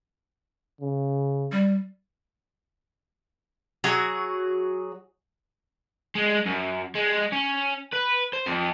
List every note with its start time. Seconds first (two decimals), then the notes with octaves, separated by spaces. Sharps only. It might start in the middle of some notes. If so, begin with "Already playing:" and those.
0.81 C#3
1.52 G3
3.84 F#3 F#4 G#4
6.15 G#3
6.46 F#2
6.95 G#3
7.32 C#4
7.93 B4
8.33 C5
8.46 F2